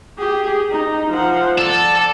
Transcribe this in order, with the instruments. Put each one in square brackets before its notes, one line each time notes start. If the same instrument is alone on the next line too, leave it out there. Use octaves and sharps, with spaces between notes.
[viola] G4 G#4
D#4
F3 F#5
[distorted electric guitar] A4 [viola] D5